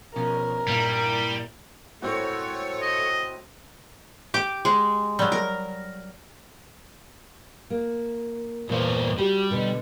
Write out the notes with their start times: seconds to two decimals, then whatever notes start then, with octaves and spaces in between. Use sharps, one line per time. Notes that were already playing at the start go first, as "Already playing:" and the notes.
0.16 B2 F3 C#4 A#4
0.67 G2 A#2 G3 E4
2.02 A2 A3 C4 F#4 C#5
2.82 D#5
4.34 G4 D6
4.65 G#3
5.19 F#3 G3
5.32 A#4
7.70 A#3
8.69 E2 G2 A#2 E3 C5
9.18 G3 F#4 G4 G5
9.51 B2 D3